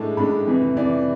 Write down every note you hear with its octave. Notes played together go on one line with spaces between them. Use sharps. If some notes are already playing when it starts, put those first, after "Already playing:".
Already playing: A2 G#3 D4 A5
A2 G#3 D4 B5
F2 C3 E3
F2 C3 E3 D5